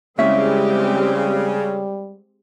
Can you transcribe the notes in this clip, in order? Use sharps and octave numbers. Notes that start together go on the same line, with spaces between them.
C#3 G3 G#3 C4 C#4 E4 G4 E5